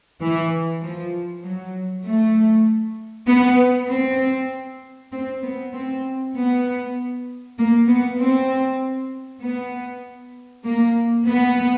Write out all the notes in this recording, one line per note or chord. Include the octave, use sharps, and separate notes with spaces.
E3
F3
F#3
A3
B3
C4
C4
B3
C4
B3
A#3
B3
C4
B3
A#3
B3